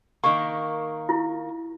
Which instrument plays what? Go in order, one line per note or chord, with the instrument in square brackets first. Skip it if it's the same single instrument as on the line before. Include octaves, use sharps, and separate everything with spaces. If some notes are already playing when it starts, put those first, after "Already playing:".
[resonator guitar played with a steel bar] D#3 A#3 [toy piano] C#6
[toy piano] E4 F4